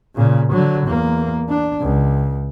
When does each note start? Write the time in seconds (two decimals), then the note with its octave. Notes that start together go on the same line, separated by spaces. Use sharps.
0.16 A#2 C#3
0.53 D3 F#3
0.86 E2 A#3
1.50 D4
1.81 C#2